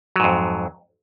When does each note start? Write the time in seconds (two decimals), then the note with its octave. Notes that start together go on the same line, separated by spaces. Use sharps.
0.16 F#3
0.20 G#2
0.24 F2